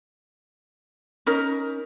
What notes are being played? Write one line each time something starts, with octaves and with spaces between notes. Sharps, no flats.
C#4 D#4 A#4